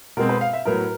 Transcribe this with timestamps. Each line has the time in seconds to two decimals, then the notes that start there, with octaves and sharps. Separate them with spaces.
0.17 B2 G#3 C4 A#4
0.29 B4
0.41 F5
0.53 E5
0.65 A2 F#3 B3 A#4